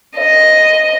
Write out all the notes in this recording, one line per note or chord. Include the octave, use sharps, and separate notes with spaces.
D#5